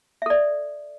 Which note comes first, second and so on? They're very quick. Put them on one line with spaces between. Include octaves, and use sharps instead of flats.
E5 A4 D5